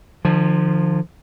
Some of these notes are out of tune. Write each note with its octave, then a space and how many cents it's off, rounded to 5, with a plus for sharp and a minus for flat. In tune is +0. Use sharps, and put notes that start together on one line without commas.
D3 +45 F3 +0